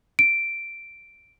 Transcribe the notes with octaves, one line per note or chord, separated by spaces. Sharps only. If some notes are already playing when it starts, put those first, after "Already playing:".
D7